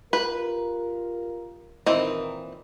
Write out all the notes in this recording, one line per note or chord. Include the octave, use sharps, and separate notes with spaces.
F4 G4 A#4 B4
A#2 D#3 E3 C4 D#5